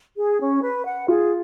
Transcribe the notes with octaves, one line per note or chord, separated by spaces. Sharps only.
G#4
C#4
B4
F#5
F4 G#4